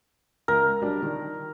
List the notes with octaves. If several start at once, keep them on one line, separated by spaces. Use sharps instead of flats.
C#2 A#4
F#3 G3 D4
D#3